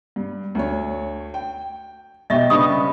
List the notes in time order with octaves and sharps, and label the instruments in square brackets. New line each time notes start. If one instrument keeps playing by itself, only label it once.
[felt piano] G2
D2 C#5
G5
[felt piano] B1 G4 [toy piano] D#5 E5 C#6
[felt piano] C#3 G3 D4 [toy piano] C#4 D#6 [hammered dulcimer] B4 C#6